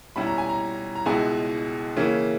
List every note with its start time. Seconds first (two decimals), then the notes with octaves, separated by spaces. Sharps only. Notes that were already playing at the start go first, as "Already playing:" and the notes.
0.16 B2 G3 C#4 E4 B5
0.27 A#5
0.38 G#5
0.49 A#5
0.95 A#5
1.06 C#2 B2 G#3 B3 E4 G#5
1.96 C#3 E3 A#3 C#4 E4